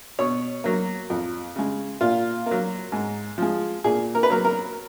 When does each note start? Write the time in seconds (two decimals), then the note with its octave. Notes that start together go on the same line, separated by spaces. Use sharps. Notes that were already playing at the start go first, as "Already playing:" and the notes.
0.19 B2 C#5
0.64 F#3 A#3
1.10 F2
1.56 C#3 G#3
2.01 A#2 F4
2.46 F#3 A#3
2.92 G#2
3.38 F3 G#3
3.84 A#2 G#4
4.15 A#4
4.23 B4
4.30 F#3 A#3 A#4
4.45 A#4